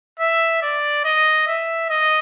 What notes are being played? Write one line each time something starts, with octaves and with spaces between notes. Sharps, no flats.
E5
D5
D#5
E5
D#5